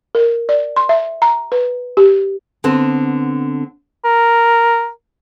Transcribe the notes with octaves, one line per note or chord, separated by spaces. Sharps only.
A#4
D5
C6
E5
A#5
B4
G4
D3 B3 C4
A#4